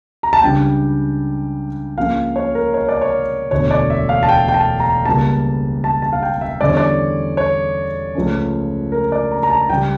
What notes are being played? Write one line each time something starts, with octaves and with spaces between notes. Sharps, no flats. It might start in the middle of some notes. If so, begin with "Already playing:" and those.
A#5
A5
C#2 C#3 G3 D4 G5
C#2 C#3 F3 A#3 C#4 F5
C#5
A#4
C#5
D5
C#5
E1 D2 D3 C#5
D5
E5
F5
A5
G5
G5
A5
A#5
C#2 C#3 G3 A#3 C#4 A5
A5
A5
F5
G5
E5
E2 D3 G3 C#4 D5
C#5
D5
C#5
C#2 C#3 F3 A3 C#4
A#4
D5
A#5
A#5
A5
C#2 C#3 G3 G5